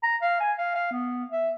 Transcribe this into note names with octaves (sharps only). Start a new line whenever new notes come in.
A#5
F5
G#5
F5
F5
B3
E5